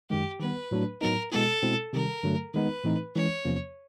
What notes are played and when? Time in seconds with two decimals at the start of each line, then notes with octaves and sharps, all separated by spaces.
0.10 F#2 D#3 G#3 G4
0.40 D#3 G3 B3 B4
0.71 A2 F#3 A3 D4
1.01 A2 F#3 B3 D#4 A#4
1.31 B2 G#3 B3 E4 A4
1.62 B2 G#3 C4 E4
1.93 C3 D#3 G3 A#4
2.23 G2 D3 F#3 A3
2.54 D#3 G#3 B3 D#4 B4
2.84 A2 E3 A3 C4 D#4
3.15 E3 G#3 C#4 C#5
3.45 E2 C3 F3 A#3 C#4